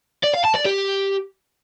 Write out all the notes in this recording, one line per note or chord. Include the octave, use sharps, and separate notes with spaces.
D5
F5
A5
D5
G4